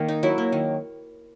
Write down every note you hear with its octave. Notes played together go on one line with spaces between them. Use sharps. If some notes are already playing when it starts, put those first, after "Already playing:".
Already playing: D#3 A#3
D#4
F#3 E4
A#3
D#3